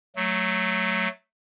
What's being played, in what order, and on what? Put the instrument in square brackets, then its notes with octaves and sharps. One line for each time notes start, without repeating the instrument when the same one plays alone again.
[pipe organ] F#3 A3